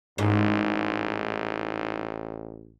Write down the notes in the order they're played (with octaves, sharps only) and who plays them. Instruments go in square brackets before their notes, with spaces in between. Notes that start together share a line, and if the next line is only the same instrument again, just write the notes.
[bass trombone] A1 [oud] G#2